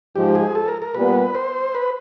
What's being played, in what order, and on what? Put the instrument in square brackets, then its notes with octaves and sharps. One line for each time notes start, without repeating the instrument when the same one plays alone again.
[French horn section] G#2 F3 G#3 [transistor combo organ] G4
[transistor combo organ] G#4
A4
A#4
A#4
[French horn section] A#2 G3 B3 [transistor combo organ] B4
[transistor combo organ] C5
B4